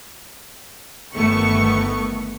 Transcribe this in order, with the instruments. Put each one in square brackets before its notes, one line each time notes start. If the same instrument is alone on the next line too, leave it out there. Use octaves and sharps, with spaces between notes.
[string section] G1 D#3 A3 B3 C#6